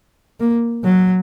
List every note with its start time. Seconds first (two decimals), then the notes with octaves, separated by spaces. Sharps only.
0.40 A#3
0.84 F#3